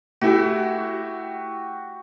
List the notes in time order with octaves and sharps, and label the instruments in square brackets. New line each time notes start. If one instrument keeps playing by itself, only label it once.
[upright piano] A3 E4 [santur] F#4 G4